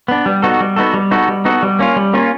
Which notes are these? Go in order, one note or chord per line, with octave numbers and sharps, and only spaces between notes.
B3 D4
G3
B3 D#4 F#4 A4
G3
B3 D#4 F#4 A4
G3
B3 D#4 F#4 A4
G3
B3 D#4 F#4 A4
G3
A#3 C#4 F4
G3
A#3 C#4 F4